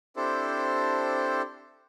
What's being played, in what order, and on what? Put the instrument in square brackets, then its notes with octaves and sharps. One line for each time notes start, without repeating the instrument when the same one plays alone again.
[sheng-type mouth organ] C4 D4 E4 G4 A4 C5